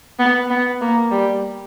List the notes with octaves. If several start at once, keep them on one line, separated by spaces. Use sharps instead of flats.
B3
B3
A#3
G3